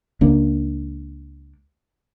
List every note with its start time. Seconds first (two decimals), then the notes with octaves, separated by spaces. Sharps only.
0.21 C#2 A#3 D4